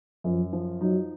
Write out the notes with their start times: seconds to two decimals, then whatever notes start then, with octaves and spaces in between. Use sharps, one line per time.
0.24 F#2 F3
0.53 F3
0.81 F#3 D#4